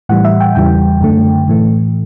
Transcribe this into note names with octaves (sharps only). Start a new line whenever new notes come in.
A2 E3 G3 F#5
E5
G5
E2 C#3 E3 G3 G5
F#2 D3 A3
A2 E3 A3